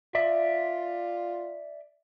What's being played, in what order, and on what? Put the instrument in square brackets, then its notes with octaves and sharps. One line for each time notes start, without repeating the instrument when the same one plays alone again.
[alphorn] F4 [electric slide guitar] D5 E5